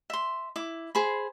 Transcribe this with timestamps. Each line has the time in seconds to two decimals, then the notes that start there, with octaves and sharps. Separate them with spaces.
0.10 E5 C6
0.56 E4 D6
0.95 G#4 C5 B5